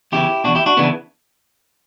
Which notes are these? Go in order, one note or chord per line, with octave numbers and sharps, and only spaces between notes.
E2 C#3 E3 E4 G4
E2 B2 D4 F#4
E4 G4
D4 F#4
C#3 E3 B3 D4